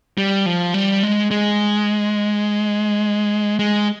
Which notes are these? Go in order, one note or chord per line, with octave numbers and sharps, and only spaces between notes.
G3
F3
G3
G#3
G#3
G#3